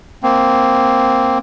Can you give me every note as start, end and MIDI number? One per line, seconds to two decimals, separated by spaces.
0.23 1.38 58
0.23 1.38 60